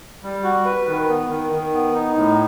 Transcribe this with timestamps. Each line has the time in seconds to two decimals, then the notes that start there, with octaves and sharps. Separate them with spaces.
0.23 G3
0.44 F#4
0.65 B4
0.87 D#3
1.08 B3
1.29 D#3
1.52 D#3
1.73 B3
1.94 D#4
2.16 A2